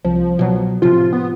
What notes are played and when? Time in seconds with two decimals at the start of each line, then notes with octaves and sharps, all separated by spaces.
0.05 C2 F3
0.39 B2 F#3
0.82 A2 C3 F3 F4
1.13 B3